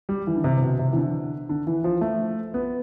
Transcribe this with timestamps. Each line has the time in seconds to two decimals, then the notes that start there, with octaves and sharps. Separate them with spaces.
0.09 G3
0.27 E3
0.36 D3
0.44 C3
0.62 B2
0.79 C3
0.93 E3
0.96 D3
1.49 D3
1.67 E3
1.84 F3
2.01 A3
2.54 B3